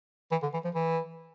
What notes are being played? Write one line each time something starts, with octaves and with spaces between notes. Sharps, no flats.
E3
D3
E3
F3
E3